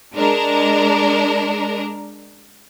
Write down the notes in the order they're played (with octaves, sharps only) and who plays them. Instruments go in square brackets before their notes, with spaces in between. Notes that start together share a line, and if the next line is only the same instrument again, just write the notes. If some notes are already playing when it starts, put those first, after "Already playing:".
[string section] G#3 D4 A#4